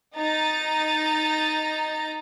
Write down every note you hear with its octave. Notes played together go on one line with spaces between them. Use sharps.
D#4 A#5 A6